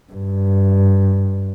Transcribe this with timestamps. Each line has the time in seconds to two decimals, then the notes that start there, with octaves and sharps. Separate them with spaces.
0.13 G2